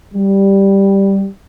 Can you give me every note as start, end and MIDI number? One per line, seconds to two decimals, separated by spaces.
0.14 1.26 55